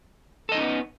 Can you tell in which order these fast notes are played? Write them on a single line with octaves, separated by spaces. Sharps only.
A4 D#5 D#4 C#4 B3